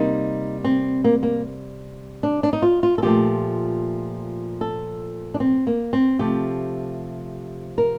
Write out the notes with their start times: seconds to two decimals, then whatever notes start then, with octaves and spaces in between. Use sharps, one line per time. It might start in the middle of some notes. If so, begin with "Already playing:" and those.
Already playing: C3 G3 A#3 D#4
0.65 C4
1.04 A#3
1.23 A#3
2.23 D4
2.43 D4
2.53 D#4
2.62 F4
2.83 F4
2.98 A4
3.02 A#2 F3 A3 G4
4.61 A4
5.34 D4
5.40 C4
5.67 A#3
5.93 C4
6.19 C3 F3 A3 G4
7.78 A#4